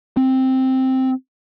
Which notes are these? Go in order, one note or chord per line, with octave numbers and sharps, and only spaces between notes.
C4